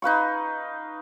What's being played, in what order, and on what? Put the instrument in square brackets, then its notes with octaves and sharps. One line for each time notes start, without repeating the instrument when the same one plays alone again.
[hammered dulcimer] D#4 B4 F5 C#6